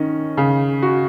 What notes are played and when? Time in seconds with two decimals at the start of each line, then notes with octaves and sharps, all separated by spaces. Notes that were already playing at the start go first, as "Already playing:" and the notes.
Already playing: D#3 C#4
0.37 C#3
0.83 F#4